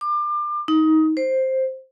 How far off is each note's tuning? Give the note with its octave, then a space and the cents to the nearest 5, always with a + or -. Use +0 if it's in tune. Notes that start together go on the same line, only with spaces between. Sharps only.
D6 +30
D#4 +20
C5 +5